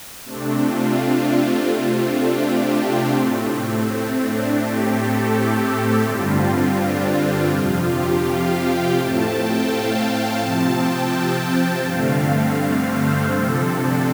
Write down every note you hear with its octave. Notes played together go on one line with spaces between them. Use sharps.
C3 A3 C4 D4
F4
D4
F4
C3 A3 C4 F4
D4
G4
D4
A2 A3 C4
C4
D4
A2 A3 C4 G4
A4
G4
G4
G2 D3 G3 C4 F4
C4
D4
F2 C3 F3 F4
G4
F5
G5
A2 A3 C4 A5
G5
F5
F5
C3 F3 C4 A5
G5
G5
G2 D3 A3 C4 F5
C5
C3 F3 C4 A4
D4